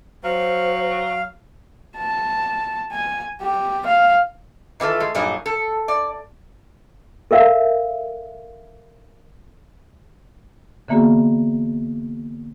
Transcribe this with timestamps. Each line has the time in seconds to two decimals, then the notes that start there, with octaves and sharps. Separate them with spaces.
0.24 F#3 C5 F5
1.97 A5
2.92 G#5
3.41 G4
3.86 F5
4.80 D#3 E3 F4 A4
5.00 G#3
5.15 G2 A#2 F#3 D#4 G#4
5.46 A4
5.88 D5
7.31 A4 A#4 E5 F5
10.88 D3 E3 A#3 B3 F#4 G#4